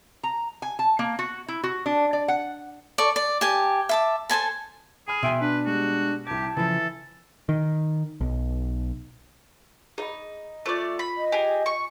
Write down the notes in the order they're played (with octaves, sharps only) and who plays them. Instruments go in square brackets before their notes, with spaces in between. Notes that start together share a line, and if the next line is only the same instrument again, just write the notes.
[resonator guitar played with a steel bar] A#5
G#5
A5
A#3
F#4
E4
F#4
D4
D5
F#5
[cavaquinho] A4 D5 C#6
D5
G4 G#5 A5
E5 A5 D6
A4 C5 G#5 A5
[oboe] G#4 [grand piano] G#5 B5 F6
[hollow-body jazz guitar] B2 G5 G#5 [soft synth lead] E5 [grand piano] C6 E6
[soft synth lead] D4 [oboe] B4
[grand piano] G3 G#3 [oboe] F#4
[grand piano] C2 G#6 [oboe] G4 [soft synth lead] A5
[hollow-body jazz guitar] C#3 F3 [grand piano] E3 E4 [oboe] A4
[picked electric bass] D#3
B1
[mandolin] D#4 [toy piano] G#4 D#5 B5
[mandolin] A3 D5 [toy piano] F4 C5 C#6
[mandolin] B5
[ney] D#5
[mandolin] G4 G#4 [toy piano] G#5
[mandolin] C#6